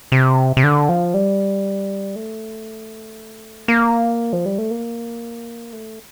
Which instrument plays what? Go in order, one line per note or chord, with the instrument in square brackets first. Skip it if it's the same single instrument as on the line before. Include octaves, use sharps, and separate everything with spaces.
[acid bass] C3
C3
D3
F3
G3
A3
A#3
F3
G3
A3
A#3
A3